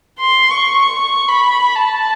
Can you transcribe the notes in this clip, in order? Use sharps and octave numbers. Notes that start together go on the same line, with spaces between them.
C6
C#6
C#6
B5
A5